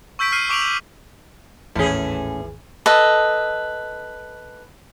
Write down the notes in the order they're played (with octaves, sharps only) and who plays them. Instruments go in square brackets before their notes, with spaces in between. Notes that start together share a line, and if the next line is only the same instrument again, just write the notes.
[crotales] C#6 E6 G6 B6 D7
F6 C7 D#7
C#6 D6 D7 F7 F#7
D6
[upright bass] G#1 D#2 [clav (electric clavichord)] A2 C#4 [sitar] E3 G#4
[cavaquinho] A4 B4 D#5